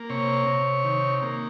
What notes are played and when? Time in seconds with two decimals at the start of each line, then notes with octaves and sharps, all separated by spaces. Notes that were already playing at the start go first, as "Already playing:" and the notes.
Already playing: A#3
0.10 C3 C#5
0.47 C3
0.84 D#3
1.22 A#3